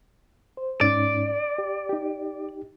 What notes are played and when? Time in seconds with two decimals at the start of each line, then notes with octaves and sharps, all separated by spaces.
0.57 C5
0.81 G#2 C#4 D#4 D5
1.58 G4
1.89 D#4 G4